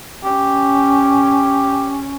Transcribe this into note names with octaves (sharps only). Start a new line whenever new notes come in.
C#4 G4